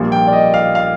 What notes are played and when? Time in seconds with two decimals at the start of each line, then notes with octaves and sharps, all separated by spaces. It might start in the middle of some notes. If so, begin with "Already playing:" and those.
Already playing: A#1 A#2 G3 A#3
0.12 G5
0.27 D5
0.33 D#5
0.54 F5
0.75 F5